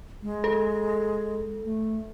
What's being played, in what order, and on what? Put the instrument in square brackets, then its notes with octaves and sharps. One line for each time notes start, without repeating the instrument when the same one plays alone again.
[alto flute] G#3
[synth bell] A4
[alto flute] A3